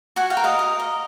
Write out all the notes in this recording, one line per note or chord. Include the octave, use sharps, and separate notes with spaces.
F#4 F#5 G#5
F5 G5
A#4
D#5 F5
A#4
D#5